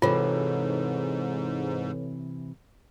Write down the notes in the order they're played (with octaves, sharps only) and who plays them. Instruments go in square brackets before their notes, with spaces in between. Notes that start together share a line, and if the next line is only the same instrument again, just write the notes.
[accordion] G#2 [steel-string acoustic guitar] C3 E3 [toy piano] F4 [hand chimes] A4 B4 C#5